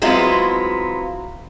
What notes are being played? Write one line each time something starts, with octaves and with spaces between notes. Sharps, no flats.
F#3 G#3 B3 C4 E4 F4